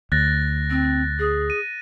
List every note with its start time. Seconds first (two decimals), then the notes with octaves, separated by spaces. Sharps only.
0.12 D2 F#6 A6 A#6
0.70 C4
1.19 G#4
1.50 D#7